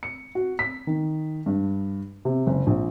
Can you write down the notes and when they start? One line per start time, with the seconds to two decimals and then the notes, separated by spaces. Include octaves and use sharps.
0.03 C#7
0.35 F#4
0.59 B6
0.87 D#3
1.46 G2
2.25 C3
2.47 F#1
2.67 A#1